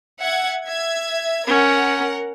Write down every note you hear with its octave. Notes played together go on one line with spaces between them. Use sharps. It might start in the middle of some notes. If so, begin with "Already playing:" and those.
E5 F#5 G#6
E5 G#6
C#4 A#4 F#5